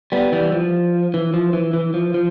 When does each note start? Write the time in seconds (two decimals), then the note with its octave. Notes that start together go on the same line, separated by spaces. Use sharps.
0.12 G3 B3
0.32 E3 G3
0.52 F3
1.14 E3
1.34 F3
1.53 E3
1.73 E3
1.94 F3
2.14 F3